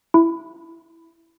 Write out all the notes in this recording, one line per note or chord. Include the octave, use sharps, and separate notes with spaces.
E4